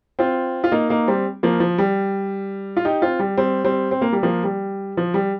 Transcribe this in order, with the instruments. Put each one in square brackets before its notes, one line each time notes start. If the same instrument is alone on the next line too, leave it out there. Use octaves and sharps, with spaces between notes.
[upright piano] C4 F4
F4
A#3 D#4
A#3 D#4
G3 C4
F3 A#3
F3
G3
F4
D#4 G4
C4 F4
G3
G3 C4
G3 C4
C4
A#3
G3
F3 A#3
G3
F3
G3